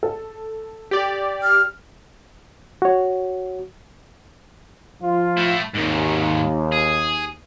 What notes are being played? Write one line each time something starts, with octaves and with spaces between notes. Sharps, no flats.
A4
G4 D5
F6
F#4 C#5
F3 F4
A3 E4
D#2 G#2 D#3
G#4